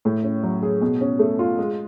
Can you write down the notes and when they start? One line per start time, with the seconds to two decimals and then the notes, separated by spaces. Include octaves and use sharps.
0.05 A2
0.24 C#4
0.43 F#3
0.63 G#4
0.81 B2
1.01 C#4
1.19 A3
1.39 F4
1.59 G#3